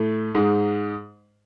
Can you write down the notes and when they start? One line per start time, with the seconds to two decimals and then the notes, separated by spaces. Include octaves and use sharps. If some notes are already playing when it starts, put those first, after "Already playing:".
Already playing: A2 A3
0.35 G#2 G#3